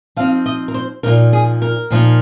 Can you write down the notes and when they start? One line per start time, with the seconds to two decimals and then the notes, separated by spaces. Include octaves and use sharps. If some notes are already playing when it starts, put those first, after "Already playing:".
0.16 F3 C4 D#4 F5
0.46 D#5
0.68 A#4
0.74 C5
1.03 A#2 F3 A#3 D#4 A#4
1.33 G#4
1.62 A#4
1.90 A#2 F3 A#3 D#4